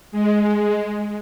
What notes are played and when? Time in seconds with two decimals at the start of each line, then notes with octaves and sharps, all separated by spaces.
0.12 G#3